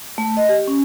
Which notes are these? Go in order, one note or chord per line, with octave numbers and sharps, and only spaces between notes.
A3
D#5
G4
C#4